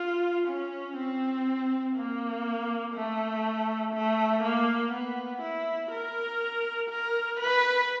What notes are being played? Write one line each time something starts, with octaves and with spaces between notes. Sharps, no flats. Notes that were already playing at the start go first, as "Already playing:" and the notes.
Already playing: F4
C#4
C4
A#3
A3
A3
A#3
B3
E4
A#4
A#4
B4